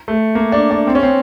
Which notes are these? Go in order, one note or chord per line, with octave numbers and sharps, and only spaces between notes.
A3
A#3
D4
D4
C4
C#4
C4